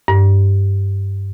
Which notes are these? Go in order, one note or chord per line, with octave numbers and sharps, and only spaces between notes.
G2